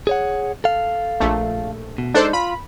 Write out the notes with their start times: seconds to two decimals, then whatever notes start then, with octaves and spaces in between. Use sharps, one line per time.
0.07 G#4 C#5 F#5
0.64 A4 F5
1.20 A#1 A3
1.98 B2
2.14 G#3 D4 D#4 A4 C5
2.33 F4 B5